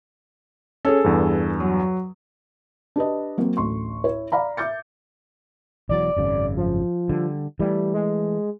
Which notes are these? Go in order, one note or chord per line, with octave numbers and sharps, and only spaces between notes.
C#4 G#4 A4 C#5
E2 G2
F#3
D4 G4 B4 D#5
F#3 A#3 C4
A1 D2 C6 C#6
E4 C#5
D5 F5 A#5 B5
E5 D6 G6 A6 C#7
E1 E2 F#3 D5
G#1 F#2 C#3
F3
D3 G3
E3 G3 A3
G#3